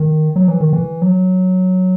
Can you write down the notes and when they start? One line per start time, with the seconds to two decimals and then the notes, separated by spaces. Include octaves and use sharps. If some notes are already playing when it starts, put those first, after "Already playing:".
Already playing: D#3
0.36 F#3
0.48 E3
0.60 D#3
0.73 E3
1.02 F#3